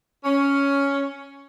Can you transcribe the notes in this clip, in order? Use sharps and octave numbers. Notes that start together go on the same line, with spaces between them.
C#4